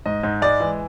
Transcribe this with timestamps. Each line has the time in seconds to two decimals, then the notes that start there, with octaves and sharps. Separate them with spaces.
0.06 G#2 D#5
0.23 G#2
0.42 G#3 D5
0.60 E3